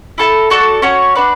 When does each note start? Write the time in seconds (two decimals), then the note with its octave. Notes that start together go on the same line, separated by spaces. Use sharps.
0.18 E4 A4 E5 A5
0.50 F#4 A4 D5 A5
0.82 C#4 F#4 C#5
1.15 D4 F#4 B4 D5